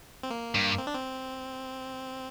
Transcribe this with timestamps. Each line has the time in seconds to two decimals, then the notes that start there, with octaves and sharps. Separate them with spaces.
0.23 C4
0.30 A#3
0.55 G2
0.78 C4
0.87 D4
0.94 C4